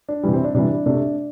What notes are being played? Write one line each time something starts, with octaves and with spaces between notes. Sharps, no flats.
D4
C3 E3 G3
C4
D4
C3 E3 G3 D4
C3 A3 D4